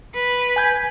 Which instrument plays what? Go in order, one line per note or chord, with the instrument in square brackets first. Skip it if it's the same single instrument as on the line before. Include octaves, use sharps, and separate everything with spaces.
[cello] B4
[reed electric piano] G#5 G6 G#6